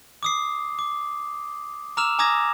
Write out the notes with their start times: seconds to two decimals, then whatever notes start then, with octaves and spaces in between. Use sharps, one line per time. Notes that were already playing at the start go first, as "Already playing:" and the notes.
0.23 D6 D#6 C7
0.79 D6
1.97 A#5 D6 E6 F6 E7 F7
2.19 G#5 A#5 D6 D#6 G#6 A#6